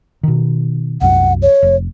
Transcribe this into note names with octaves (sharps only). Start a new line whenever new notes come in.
B2 D#3
C2 F#2 F#5
C#5
F1